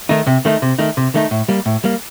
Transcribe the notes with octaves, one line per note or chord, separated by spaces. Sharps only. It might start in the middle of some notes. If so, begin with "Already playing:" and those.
D#3 A3 D#4
C3
D#3 A3 D#4
C3
D#3 A3 D#4
C3
D#3 A3 D#4
A2
G3 A#3
A2
G3 A#3